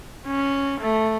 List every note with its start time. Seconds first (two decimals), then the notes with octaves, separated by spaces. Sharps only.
0.26 C#4
0.80 A3